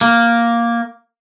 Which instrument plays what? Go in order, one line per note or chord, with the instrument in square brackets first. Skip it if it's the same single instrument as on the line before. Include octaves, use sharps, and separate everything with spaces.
[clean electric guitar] A#3